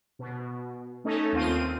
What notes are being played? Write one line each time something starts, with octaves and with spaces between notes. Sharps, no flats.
B2
A3 C#4 D#4 A4
D#2 C4 F4 D#7